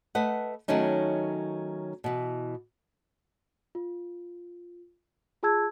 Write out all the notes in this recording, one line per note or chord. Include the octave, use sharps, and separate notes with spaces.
A3 B4 D#5 F#5
D#3 F#3 A3 C#4 D#4
B2 E3
F4
F4 G#4 A5 E6 G#6